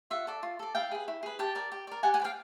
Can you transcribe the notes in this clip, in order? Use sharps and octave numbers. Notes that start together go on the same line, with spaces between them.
F4 E5 F#5
A4 D5
F4
A4 D5
E4 F5 G5
G#4 B4
E4
G#4 B4
G4 G5 A5
A#4 D5
G4
A#4 D5
G4 F#5 G#5
F#5 G#5
B4 D5
F5 G5